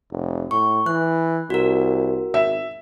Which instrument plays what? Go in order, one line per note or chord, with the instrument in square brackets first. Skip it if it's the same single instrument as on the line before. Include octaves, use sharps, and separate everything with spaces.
[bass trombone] F1
[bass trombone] A2 [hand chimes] C#6
[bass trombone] E3 [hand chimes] F#6
[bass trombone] C2 [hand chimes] F#4 A#4
[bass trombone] G#1 [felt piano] E5